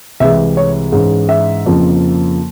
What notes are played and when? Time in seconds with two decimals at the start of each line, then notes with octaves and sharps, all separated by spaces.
0.20 C2 C3 E3 G#3 E5
0.57 C#5
0.92 G#2 E3 G#3 C#4
1.29 E5
1.66 F2 C#3 F3 A#3